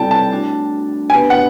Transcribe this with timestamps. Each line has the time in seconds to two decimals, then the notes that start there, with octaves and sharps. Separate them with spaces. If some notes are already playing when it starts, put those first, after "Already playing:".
Already playing: G3 C4 E4 A4 D5 G5 A5
0.11 A5
0.31 A3 D4 F#4
1.10 B3 D4 G4 B4 G#5
1.30 F#5